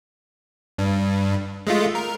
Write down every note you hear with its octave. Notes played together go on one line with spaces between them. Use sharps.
G2
G#3 A3 F4
A#4